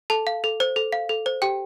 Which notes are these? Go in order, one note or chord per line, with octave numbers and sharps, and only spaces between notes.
A4 A5
F5
A4
C5
A4
F5
A4
C5
G4 G5